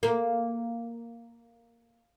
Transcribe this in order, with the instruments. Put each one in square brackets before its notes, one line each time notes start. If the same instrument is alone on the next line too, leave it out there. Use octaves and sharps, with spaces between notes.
[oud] A#3